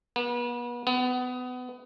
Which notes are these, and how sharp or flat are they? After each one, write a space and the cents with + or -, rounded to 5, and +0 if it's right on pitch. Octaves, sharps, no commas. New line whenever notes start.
B3 -35
B3 +25